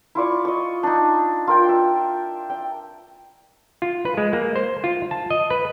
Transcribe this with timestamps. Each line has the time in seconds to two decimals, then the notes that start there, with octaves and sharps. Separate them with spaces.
0.15 E4 F4 D5 C#6
0.45 D#5 C#6
0.83 D4 D#4
1.47 F4 A#4 G5
1.69 E5
2.50 G5
3.82 F4
4.05 B4
4.17 G#3
4.33 A#3
4.56 C5
4.84 F4
5.11 A5
5.30 D#5
5.50 B4